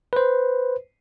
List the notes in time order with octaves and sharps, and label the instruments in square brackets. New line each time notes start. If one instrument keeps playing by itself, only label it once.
[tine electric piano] B4 C5